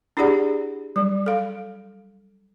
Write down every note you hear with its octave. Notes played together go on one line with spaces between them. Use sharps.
D4 E4 G4 G#4 D5 F#5
F#3 G3
A4 F5